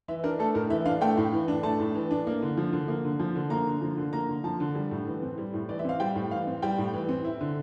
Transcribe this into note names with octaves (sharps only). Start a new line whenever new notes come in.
E3 E5
D4 A#4
A3 A4
A2 A#4
E3 E5
D4 F5
A3 G5
A2
E3
D4
A3 A5
A2
E3
D4
A#3
D3
F3
D3
A#3
D3
F3
D3
A#3 A#5
D3
F3
D3
A#3 A#5
D3
F3 A5
D3
G3
A2
E3
C4
G3
A2
E3 D5
E5
C4 F5
G3 G5
A2
E3 F5
C4
G3 G5
A2
E3
C4
E4
D3